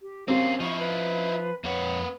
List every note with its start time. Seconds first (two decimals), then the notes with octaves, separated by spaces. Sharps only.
0.02 G4
0.28 A#3 C4 C#4 G4 F5
0.60 F3 D#4 E4 C#6
0.79 B4
1.64 F2 A#3 B4 C#5 F#5